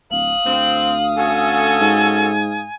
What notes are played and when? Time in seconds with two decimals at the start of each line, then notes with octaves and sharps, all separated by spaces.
0.11 D1 F5 D#6 F#7
0.45 D2 C4
1.16 C#4 F#4 A4 G#5
1.81 G#2